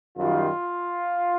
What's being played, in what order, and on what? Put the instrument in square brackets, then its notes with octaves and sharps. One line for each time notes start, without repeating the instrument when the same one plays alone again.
[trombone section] F#2 D#3 G3 F4